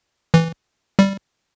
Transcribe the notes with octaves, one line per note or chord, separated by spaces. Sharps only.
E3
G3